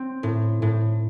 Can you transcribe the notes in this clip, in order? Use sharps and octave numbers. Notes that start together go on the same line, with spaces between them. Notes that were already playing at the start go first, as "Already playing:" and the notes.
Already playing: C4
A2
A2